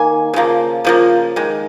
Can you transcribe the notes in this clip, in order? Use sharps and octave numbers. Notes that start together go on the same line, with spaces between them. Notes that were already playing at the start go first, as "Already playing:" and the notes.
Already playing: D#3 A#3 G#5
C#3 F3 A#3
C#3 F3 A#3
D#3 G#3